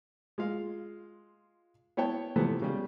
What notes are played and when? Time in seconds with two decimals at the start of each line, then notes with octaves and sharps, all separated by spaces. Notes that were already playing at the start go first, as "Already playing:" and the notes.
0.38 G#3 F4 F5
1.97 B3 E4 C#5 G5 A5
2.36 C3 E3 F3 A3 B3
2.62 C#3 G3